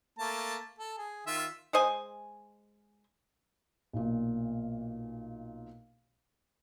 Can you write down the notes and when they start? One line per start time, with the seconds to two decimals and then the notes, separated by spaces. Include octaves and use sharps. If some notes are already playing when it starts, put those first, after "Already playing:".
0.19 A3 A#3 A5
0.79 A4
0.98 G#4
1.27 D#3 F4 E5
1.73 G#3 C5 D#5 G#5
3.93 B1 A#2